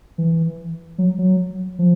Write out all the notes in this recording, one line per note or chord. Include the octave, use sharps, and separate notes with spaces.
E3
F#3
F#3
F3